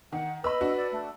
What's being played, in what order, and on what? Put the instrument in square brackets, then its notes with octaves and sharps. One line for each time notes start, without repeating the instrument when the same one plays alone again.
[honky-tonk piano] D#3 [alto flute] F#5
[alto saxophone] B4 [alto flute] D#5 [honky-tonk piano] B5 E6
[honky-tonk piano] D4 F#4
[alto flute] D5
A3